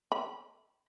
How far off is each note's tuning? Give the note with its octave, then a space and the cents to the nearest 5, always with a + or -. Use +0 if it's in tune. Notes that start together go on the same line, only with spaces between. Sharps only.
B5 -20